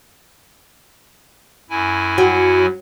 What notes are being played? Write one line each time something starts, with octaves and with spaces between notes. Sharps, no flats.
F#2 E4 G#5
F#3